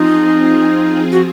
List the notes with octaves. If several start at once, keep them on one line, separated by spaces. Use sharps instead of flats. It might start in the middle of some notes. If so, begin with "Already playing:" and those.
Already playing: F3 C4 D#4 F4 G#4
F#4